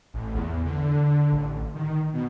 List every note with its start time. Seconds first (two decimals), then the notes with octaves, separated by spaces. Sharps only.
0.14 A1
0.35 E2
0.66 D3
1.32 A1
1.75 D#3
2.14 B2